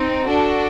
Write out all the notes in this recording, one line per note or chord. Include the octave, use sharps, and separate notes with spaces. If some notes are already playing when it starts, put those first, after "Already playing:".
Already playing: C4 D#4
D4 F#4 A4